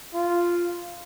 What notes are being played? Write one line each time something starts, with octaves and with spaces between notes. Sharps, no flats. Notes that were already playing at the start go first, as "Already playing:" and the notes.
F4